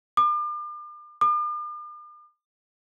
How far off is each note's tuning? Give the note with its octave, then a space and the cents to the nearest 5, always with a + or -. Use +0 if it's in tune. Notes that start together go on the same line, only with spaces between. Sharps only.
D6 +40
D6 +45